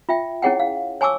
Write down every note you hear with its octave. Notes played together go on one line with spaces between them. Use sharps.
F4 E5 G5
C#4 E4 G#4 C#5 F#5 G5
F5
C#5 G#5 A5 C#6 D6 E6